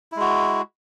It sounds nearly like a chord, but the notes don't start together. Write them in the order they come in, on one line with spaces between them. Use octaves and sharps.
E4 G#3 F#4